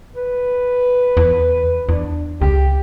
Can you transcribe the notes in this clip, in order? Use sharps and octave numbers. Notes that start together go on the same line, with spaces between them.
B4
E2
E2 D4
C#2 G4